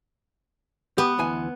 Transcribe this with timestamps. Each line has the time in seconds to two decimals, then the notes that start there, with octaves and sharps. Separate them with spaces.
0.98 B3 G4
1.19 D2 E3 G#5